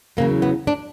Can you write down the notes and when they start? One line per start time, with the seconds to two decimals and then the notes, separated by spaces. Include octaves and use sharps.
0.17 E2 C#3 F#3 A#3
0.42 B3
0.67 D4